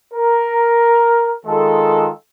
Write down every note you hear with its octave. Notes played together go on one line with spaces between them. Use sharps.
A#4
D#3 G#3 F4 A4